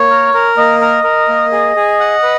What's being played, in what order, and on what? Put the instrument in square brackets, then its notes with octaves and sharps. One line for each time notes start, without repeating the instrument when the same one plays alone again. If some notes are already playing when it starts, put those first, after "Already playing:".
Already playing: [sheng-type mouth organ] A#3 [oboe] C#5
[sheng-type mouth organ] A#4
A#4
[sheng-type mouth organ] A#3 [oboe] D#5
[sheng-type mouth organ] A#4
A#4
A#3
G#4
G#4
F#5
B4